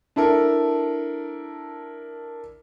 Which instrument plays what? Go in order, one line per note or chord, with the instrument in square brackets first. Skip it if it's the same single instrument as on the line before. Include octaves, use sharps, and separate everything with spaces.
[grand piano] D4 E4 A4 A#4